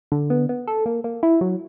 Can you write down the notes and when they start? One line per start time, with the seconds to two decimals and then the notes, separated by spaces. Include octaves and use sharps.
0.12 D3
0.30 B3
0.49 B3
0.68 A4
0.86 A#3
1.04 A#3
1.23 E4
1.41 F#3